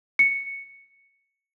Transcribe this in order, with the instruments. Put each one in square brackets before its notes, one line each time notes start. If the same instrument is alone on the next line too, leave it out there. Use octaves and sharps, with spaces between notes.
[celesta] C#7